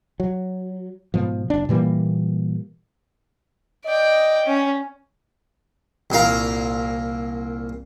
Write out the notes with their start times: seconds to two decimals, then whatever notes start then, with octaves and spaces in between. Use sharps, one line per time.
0.20 F#3
1.14 G#2 B2 F3
1.50 F#1 D4
1.69 A#2 E3 G3 A#3
3.86 D5 D#5 G5
4.46 C#4
6.10 C2 A#2 F5 A#5